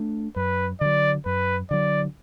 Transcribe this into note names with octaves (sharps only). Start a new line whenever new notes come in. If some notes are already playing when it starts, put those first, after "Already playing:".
Already playing: A3 D4
F#2 B4
D3 F#3 D5
F#2 B4
D3 F#3 D5